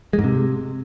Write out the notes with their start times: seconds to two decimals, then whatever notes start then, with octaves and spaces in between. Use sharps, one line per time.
0.13 G#3
0.19 G#2
0.24 C3